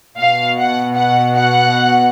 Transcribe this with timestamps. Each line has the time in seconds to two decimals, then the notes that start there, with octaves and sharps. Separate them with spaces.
0.19 B2 F5
0.58 F#5
0.96 F#5
1.35 F#5